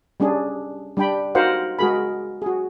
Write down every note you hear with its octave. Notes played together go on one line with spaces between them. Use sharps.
G3 C#4 D4 G#4
G3 D4 G5 B5
D#4 F#4 A#4 C5 F5 F#5
G#3 F#4 G#4 A#4 B5
F#4 G#4